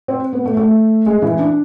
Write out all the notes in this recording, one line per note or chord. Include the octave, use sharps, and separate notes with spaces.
C4
B3
A3
A3
G#3
E3
D4